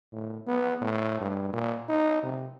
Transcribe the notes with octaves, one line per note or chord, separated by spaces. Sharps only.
A2
B3
A2
G2
A#2
D#4
C3